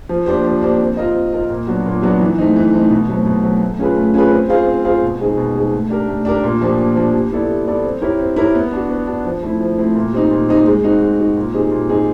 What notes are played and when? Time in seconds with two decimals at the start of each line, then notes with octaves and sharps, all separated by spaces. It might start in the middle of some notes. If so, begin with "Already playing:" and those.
0.09 F3
0.26 A#3 D4 G4 C5
0.44 F3
0.61 A#3 D4 G4 C5
0.80 C4
0.97 F4 A#4 D#5
1.15 C4
1.33 F4 A#4 D#5
1.50 A#2
1.67 F#3 B3 D4 F#4
1.86 A#2
2.02 F#3 B3 D4 F#4
2.21 E3
2.38 A3 C4 D#4
2.56 E3
2.74 A3 C4 D#4
2.90 B2
3.08 F#3 A3 C4
3.26 B2
3.43 F#3 A3 C4
3.62 A3
3.79 C#4 F4 G#4 B4
3.96 A3
4.14 C#4 F4 G#4 B4
4.31 C4
4.49 F4 G#4 C5 F5
4.66 C4
4.84 F4 G#4 C5 F5
5.02 B2
5.19 G#3 C4 D#4 G#4
5.37 B2
5.55 G#3 C4 D#4 G#4
5.73 A3
5.90 D4 G4 A#4
6.08 A3
6.25 D4 G4 A#4
6.44 A#2
6.61 F3 A#3 D4 G4
6.78 A#2
6.95 F3 A#3 D4 G4
7.13 G3
7.32 B3 E4 A4 D5
7.49 G3
7.66 B3 E4 A4 D5
7.84 C4
8.02 E4 G4 A#4 C#5
8.19 C4
8.36 E4 G4 A#4 C#5
8.55 B3
8.73 D4 F#4
8.90 B3
9.07 D4 F#4
9.25 F3
9.43 A3 C4 E4
9.61 F3
9.78 A3 C4 E4
9.96 A#2
10.13 G3 C4 D#4
10.31 A#2
10.49 G3 C4 D#4
10.66 G#3
10.83 C4 D#4 F#4
11.02 G#3
11.18 C4 D#4 F#4
11.37 A#2
11.54 G3 C4 D#4 G#4
11.71 A#2
11.89 G3 C4 D#4 G#4